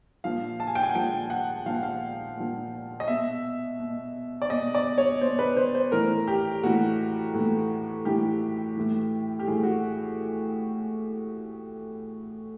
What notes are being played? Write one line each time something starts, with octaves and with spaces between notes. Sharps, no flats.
A#2 F3 F5
A5
G#5
G5
G#5
F#5
A#2 F3 G5
F#5
A#2 F3 F5
F#5
F5
A#2 F3
D#5
B2 E5
B2
D5
B2 D#5
D5
C#5
B2 C5
B4
C5
C5
A2 E3 A#4
G4
A2 E3 F#4
A2 E3
A2 E3 G4
A2 E3
G4
A2 E3 G#4
F#4